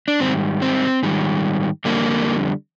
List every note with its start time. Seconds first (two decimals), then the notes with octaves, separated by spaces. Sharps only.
0.08 D4
0.20 G#2 D#3 G3 C4
0.62 C4
1.03 G#2 D#3 G3
1.85 F2 D3 G3 A#3